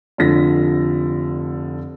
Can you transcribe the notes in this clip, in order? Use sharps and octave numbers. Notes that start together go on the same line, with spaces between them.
F1 D3 F3 A#6 B6